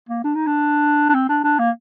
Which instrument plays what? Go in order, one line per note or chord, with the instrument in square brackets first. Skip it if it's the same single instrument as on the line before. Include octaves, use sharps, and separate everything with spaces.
[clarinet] A#3
D4
D#4
D4
D4
C4
D4
D4
A#3